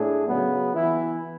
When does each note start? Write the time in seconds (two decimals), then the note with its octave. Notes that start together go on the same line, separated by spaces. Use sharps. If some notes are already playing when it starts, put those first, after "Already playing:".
Already playing: A2 D4 G#4
0.27 C#3 F#3 B3
0.73 E3 B3 E4